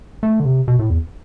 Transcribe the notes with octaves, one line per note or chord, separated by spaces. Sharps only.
A3
D3
C3
B2
A2
E2